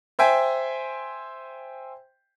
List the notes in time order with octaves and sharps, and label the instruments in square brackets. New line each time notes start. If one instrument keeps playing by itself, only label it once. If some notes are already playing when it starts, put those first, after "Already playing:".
[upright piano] C5 E5 G5 G#5